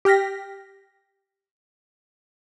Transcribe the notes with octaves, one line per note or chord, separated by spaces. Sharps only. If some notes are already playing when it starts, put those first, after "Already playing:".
G4 G5 F6 A#6 B6